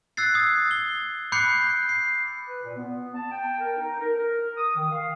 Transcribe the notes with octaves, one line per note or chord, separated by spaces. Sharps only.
E6 F#6 G#6 A6 C7
D#6 G#6
G7
B5 D6 F#6 G6 C7 C#7
C7
B4
A#2
B3
A5
G5
A#4
D#4
A#4
A#4
D#6
D#3
F5